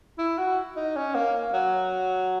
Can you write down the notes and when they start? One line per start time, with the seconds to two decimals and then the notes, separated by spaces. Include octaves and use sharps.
0.18 E4
0.38 F#4
0.76 D#4
0.96 C#4
1.14 A#3
1.53 F#3